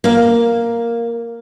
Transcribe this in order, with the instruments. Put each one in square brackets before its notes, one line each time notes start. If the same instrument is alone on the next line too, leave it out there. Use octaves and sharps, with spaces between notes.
[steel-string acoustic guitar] A#3 F5